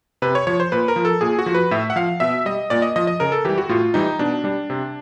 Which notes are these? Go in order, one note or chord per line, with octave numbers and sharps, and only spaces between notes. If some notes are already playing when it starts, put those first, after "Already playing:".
C3 B4
C#5
F3 C#5
C5
A#2 B4
A#4
F3
A4
A#2 G#4
F#4
F3
B4
A2 E5
F#5
F3 F5
B2 E5
G3 D#5
A#2 D5
D#5
F3 D#5
D#5
C#3 A#4
A4
E3 G3 G4
F#4
A2 F4
E3 G3 D#4
B2 D4
G3 D4
C3